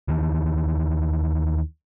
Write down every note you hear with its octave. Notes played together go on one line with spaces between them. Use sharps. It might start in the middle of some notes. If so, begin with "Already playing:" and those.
D#2 D#3 E3